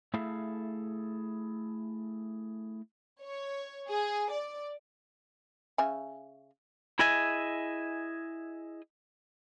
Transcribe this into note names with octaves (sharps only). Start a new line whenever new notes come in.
A3 E4 G#4 A4 E5 F5
C#5
G#4
D5
C#3 E5 G#5
E4 G#4 D#5 E5 G#5